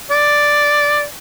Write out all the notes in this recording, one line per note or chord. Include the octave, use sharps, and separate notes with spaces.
D5